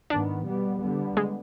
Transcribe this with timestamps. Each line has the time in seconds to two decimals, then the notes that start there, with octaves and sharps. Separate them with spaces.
0.10 G#2 D#3 B3 D4
0.45 B2 G3 B3
0.81 D3 G3 B3
1.17 G#3